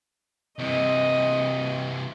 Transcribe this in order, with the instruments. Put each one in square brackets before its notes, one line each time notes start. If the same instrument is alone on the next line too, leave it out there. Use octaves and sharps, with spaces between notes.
[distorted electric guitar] C3 E3 [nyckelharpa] D#5